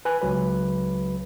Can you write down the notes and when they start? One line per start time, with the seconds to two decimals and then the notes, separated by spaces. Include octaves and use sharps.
0.05 B4 G#5 F#6
0.21 C#2 F#3 B4